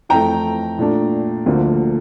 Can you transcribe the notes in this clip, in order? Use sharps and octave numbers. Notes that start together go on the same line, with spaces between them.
F2 E3 A3 G5 A#5
A#2 A3 D4
D2 D3 F3 A#3